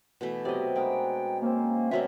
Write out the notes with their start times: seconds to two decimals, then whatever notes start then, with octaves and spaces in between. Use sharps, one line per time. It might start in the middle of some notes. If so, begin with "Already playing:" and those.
0.21 B2 E3 A3
0.45 C3 F#3 B3 G4 D5 D#5
0.75 G#3 D4 A#4 B4 G5
1.42 A#3 C4 C#4
1.91 B2 F#3 A#3 F#4 E5 G#5 C6